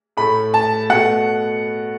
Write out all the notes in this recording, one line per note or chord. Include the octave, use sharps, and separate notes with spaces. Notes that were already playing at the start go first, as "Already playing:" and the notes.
A2 A3 B5
A5
B2 A3 F#5